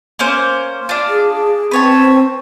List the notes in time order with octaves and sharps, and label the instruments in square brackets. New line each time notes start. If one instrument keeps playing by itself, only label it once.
[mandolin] A#3 C#4 C5
D4 F4
[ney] G#4
[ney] C4 [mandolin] B4 C#5 A5